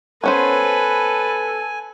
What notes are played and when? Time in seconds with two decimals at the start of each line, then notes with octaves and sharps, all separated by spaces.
0.24 B3 C#4 A4 B4 C5 G#5